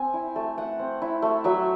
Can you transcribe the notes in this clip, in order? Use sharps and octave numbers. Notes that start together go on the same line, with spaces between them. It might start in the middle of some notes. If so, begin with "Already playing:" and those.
Already playing: C4 G#5
E4
A3
A3 F#5
C4
E4
A3
F#3 E5